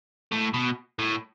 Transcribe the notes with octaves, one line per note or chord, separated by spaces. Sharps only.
A2
B2
A2